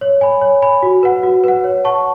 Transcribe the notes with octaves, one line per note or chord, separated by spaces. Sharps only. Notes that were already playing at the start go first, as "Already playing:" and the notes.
C#5
G#5 B5
C#5
G#5 B5
F#4
B4 F#5
F#4
B4 F#5
C#5
F#5 A5 C#6